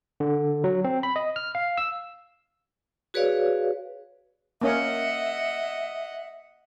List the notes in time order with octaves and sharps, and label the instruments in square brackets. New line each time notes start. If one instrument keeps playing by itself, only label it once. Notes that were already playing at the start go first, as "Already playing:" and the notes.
[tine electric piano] D3
F#3
C4
B5
D#5
F6
F5
E6
[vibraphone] F#4 G#4 B4 C#5 D5 F5
[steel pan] A#3 C#4 C#5 [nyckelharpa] D#5 F#5 [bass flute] E5